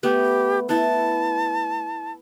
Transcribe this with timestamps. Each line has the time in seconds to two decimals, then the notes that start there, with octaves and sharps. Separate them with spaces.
0.03 A3 B3 G4
0.69 B3 E4 A5